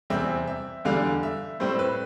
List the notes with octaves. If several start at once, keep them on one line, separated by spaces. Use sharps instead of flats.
E2 C3 G3 C4 E5
E5
E2 D3 G3 F5
E5
A2 G3 C4 C5
B4